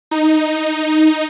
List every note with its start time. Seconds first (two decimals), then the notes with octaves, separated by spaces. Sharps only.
0.11 D#4